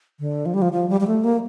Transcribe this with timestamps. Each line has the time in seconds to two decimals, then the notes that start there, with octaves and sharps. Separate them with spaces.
0.20 D3
0.46 F3
0.54 G3
0.62 F3
0.72 F3
0.90 G3
1.00 G3
1.07 A3
1.24 A#3